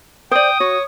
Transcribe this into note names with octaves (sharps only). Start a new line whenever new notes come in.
C5 D5 G5 D#6
F#4 C#5